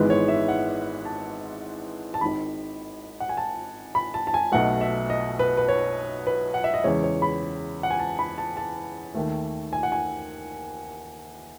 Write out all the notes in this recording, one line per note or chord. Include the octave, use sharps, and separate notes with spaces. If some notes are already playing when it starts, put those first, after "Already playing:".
Already playing: G#1 G#2 E3 G#3 B3 B4
C#5
E5
F#5
A5
A5
G#1 G#2 D#3 B5
F#5
G#5
A5
B5
A5
A5
G#5
B1 B2 A3 F#5
E5
D#5
B4
B4
C#5
B4
F#5
E5
D#5
E2 C#3 G#3 C#5
C#5
B5
F#5
G#5
A5
B5
A5
A5
D#2 D#3 A3
G#5
F#5
G#5